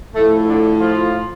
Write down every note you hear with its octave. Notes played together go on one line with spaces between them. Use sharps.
A2 F3 A3
D3 D4
F3 F4